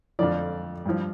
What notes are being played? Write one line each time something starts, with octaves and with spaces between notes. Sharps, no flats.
F2 D3 F3 D5
G2 F3